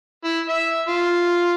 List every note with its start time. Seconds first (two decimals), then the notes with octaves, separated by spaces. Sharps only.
0.25 E4
0.49 E5
0.88 F4